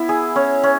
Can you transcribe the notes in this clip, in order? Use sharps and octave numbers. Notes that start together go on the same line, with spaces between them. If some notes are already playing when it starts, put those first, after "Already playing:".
Already playing: B3 E4
G#4
C#4
C#4